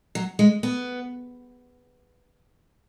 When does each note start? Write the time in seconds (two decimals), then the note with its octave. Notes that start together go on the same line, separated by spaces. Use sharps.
0.15 F#3
0.39 G#3
0.63 B3